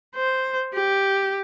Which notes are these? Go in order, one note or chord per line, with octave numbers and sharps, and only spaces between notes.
C5
G4